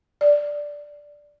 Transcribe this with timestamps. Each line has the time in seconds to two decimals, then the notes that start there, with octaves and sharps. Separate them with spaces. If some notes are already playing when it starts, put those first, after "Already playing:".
0.21 D5